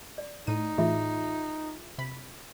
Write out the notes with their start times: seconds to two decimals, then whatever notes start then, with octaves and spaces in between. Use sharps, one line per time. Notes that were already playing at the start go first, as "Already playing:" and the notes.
0.18 D5
0.47 A2 D#4 D#7
0.78 A2 E3 F4 G#4 E5
1.98 C3 B5